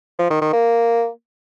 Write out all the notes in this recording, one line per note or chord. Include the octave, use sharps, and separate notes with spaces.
F3
D#3
D#3
A#3